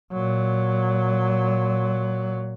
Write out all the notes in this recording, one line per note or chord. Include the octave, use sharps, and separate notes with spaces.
A#2 F#3